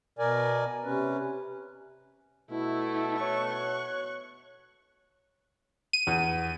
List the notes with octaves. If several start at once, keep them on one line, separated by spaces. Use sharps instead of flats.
B2 A#4 D5 G#5
C3 C#4 B4
B2 A3 E4
B2 C#5 C#6 F#6
D#7
E2